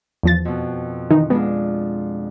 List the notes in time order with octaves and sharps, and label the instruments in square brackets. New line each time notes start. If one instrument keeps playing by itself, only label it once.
[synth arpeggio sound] E2 F3 A6
[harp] F2 B2
[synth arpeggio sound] D#3 E3 D#4
[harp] G#3 D4 F4 [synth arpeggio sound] B3